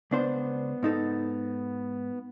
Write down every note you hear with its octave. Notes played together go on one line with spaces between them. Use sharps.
C#2 B3 D4 C5
G#2 D#4 A4